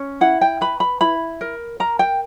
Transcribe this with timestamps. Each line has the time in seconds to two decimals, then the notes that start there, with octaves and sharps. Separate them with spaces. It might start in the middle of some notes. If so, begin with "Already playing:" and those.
Already playing: C#4
0.21 E4 F#5
0.41 G5
0.61 B4 B5
0.80 B5
1.01 E4 B5
1.41 A#4
1.80 A#4 A#5
1.99 G5